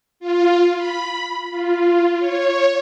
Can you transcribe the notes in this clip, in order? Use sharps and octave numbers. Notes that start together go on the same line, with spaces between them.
F4
B5
F4
C#5